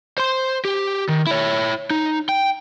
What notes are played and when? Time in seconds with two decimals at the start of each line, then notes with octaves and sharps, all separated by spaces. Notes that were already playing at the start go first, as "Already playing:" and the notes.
0.18 C5 C6
0.65 G4
1.09 D#3
1.27 E4 C#5
1.90 D#4
2.29 G5